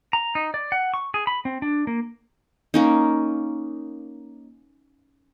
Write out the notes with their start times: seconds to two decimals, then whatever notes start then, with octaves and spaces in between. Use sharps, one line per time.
0.13 A#5
0.35 D#4
0.54 D5
0.72 F#5
0.94 C#6
1.14 G#4
1.27 B5
1.45 C4
1.62 D4
1.87 A#3
2.74 A#3 C#4 D#4